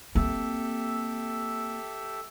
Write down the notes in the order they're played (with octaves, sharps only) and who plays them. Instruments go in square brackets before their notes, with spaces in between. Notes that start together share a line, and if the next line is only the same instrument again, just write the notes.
[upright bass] A#3 C4 [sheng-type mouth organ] G4 A4 E5